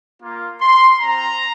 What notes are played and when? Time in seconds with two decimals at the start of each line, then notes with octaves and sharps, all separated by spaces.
0.21 A#3 F4
0.60 C6
0.99 C4 F4 A#5